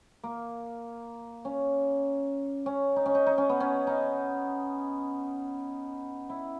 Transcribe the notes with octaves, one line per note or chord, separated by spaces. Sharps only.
A#3
C#4
C#4
D#4
C#4
D#4
D#4
C#4
B3
C#4
D#4
E4